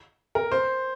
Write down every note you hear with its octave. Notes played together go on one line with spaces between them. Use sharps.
A#4
C5